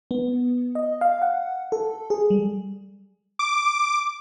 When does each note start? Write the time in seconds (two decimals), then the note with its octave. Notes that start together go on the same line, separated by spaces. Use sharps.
0.11 B3
0.75 D#5
1.01 F5
1.22 F#5
1.72 A4
2.10 G#4
2.30 G3
3.39 D6